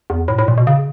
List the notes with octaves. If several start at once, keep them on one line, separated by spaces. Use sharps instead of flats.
E2
A2
A2
A#2
B2
C#3